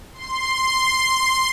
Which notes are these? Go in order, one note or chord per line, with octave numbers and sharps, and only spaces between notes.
C6